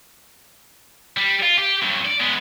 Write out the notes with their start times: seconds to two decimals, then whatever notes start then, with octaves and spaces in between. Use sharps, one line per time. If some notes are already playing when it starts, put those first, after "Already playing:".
1.17 G3
1.43 F4
1.57 G4
1.83 G2 F#3
2.06 D5
2.21 G#3 B3